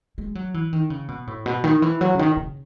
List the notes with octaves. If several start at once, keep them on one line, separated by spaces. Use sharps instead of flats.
G#3
F#3
E3
D#3
C#3
B2
A2
B2
D#3
E3
F#3
C#3
D#3
C#3